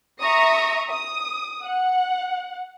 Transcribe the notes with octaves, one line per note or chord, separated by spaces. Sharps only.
E5 A#5 C#6 D#6 A#6 C#7
D#6
F#5